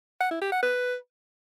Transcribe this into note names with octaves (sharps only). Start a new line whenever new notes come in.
F#5
E4
G4
F#5
B4